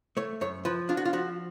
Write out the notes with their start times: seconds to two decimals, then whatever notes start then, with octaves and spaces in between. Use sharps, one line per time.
0.17 A3 C#5
0.41 F#2 C#5
0.65 F3 B4
0.89 D4 F4
0.97 F#4
1.05 F4
1.13 F3 F#4